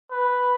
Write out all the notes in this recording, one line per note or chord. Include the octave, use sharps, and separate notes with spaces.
B4